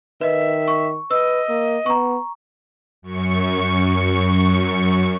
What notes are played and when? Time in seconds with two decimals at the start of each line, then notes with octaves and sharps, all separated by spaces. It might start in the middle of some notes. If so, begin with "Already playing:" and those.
0.21 D#3 B4 D#5 E5
0.68 C#6
1.11 B4 D#5 E6
1.49 A#3
1.86 B3 A#5 C#6
3.02 F#2 C#6